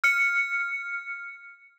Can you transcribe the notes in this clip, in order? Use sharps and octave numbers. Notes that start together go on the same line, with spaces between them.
F6 C#7